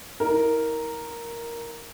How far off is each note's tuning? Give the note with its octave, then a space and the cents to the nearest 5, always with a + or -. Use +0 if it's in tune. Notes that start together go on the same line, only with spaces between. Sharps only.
E4 -40 A#4 +0